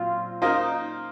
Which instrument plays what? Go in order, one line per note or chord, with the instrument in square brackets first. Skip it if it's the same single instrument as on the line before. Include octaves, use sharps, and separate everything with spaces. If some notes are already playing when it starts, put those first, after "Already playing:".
Already playing: [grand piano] A#2 F#3 C4 [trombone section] F4
[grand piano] A#3 F4 C5 D#5 [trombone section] D#4